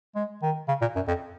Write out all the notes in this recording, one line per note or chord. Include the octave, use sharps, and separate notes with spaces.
G#3
D#3
C#3
A#2
F#2
F2